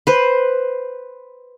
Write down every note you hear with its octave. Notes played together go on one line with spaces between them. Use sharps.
B4 C5